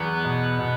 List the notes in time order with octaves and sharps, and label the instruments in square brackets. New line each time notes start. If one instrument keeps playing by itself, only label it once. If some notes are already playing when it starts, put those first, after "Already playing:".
Already playing: [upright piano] E2 F#3 [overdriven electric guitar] B3
[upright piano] B2
B2